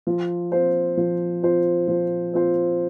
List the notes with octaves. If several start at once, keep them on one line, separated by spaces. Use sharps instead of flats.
F3
C4 F4 C5
F3
C4 F4 C5
F3
C4 F4 C5